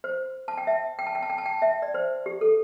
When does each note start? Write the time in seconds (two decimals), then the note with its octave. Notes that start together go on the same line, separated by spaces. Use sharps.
0.04 C5
0.48 A5
0.58 G5
0.67 E5
0.99 G5
1.07 A5
1.15 G5
1.22 A5
1.30 G5
1.38 A5
1.46 G5
1.62 E5
1.82 D5
1.94 C5
2.26 G4
2.41 A4